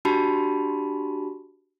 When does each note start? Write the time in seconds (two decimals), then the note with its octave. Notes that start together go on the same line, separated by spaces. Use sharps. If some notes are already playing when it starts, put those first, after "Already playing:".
0.05 D4 F#4 G4 A5 B5